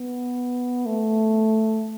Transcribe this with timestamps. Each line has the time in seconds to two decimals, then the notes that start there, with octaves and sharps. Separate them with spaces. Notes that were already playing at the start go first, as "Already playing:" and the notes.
Already playing: B3
0.86 A3